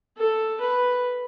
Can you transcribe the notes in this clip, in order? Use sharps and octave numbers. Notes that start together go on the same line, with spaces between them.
A4
B4